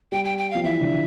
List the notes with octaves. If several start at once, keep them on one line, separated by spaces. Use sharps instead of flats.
G3 G5
G5
G5
F3 F5
E3 E5
D3